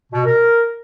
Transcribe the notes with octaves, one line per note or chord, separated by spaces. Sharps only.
B2
A#4